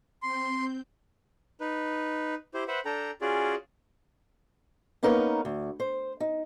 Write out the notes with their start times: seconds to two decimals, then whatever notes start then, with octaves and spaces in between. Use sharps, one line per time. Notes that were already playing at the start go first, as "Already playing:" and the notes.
0.22 C4 C6 G6
1.61 D#4 B4
2.54 E4 G4 C5
2.68 B4 C5 E5 F#5
2.85 D4 A4 G5 A#5
3.21 C#4 F4 F#4 G#4 D5
5.03 A#3 B3 C#4 D#4 A#4 B4
5.45 D2
5.80 C5
6.20 D#4